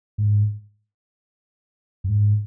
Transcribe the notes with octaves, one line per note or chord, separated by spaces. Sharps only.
G#2
F#2
G#2